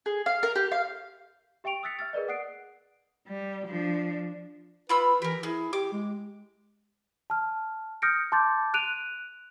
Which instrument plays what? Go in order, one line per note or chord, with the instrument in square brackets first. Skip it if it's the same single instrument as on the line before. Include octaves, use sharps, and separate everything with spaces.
[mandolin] G#4
F5
A#4
G4
F5
[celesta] G4 E5 G5 C#6 D7 F7
D#6 E6 F#6 A6 B6 C#7
E5 F6 A6
G#4 A#4 B4 D5 D#5
F#5 D#6 F#6 C7 D7
[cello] G3
F3 D4
[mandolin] F4 B5 E6 [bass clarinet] B4
[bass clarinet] E3 [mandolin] G4 A#4
[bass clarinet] E4 [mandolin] G#4
[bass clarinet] G4 [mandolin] D6
[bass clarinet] G#3
[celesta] A5 F6
D#6 F6 G6 A#6 C#7 D7
A5 C6 D6 G6 A6
F#6 D7 D#7 F7